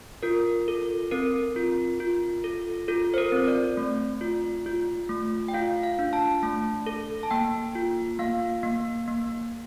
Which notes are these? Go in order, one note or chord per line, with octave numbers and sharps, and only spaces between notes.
F4 A#4
A4
C4 A#4
F4
F4
A4
F4 A4
C5
A#4
C4
D5
A3
F4
F4
A3
G5
F4 F5
F5
D4
A5
A3
A4
A5
A#3 G5
F4
A#3 F5
A#3
A#3